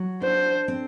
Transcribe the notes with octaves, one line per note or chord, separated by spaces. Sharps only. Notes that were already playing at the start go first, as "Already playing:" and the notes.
Already playing: F#3
D4 C5
C4